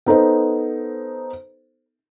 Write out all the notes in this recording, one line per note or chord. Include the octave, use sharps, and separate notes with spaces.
B3 D#4 A4 C5